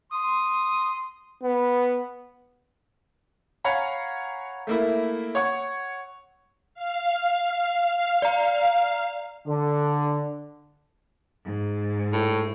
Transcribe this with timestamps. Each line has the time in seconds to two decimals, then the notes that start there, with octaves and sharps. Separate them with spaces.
0.12 C6 D#6
1.42 B3
3.64 C#5 F5 F#5 G#5 A#5 B5
4.67 A3 A#3 E4
5.35 C#5 F#5 C#6
6.74 F5
8.22 D5 A#5
9.46 D3
11.44 G#2
12.13 A2